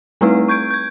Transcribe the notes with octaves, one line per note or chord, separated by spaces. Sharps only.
G3 A3 C4 D#4 E4 B4
C#6 G6 G#6 D7
G6 G#6